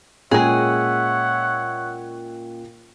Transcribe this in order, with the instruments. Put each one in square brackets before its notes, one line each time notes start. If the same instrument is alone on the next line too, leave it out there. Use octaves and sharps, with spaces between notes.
[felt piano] A#2 C#4 G5 [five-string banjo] G#3 G#4 [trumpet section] C#5 E5 F#5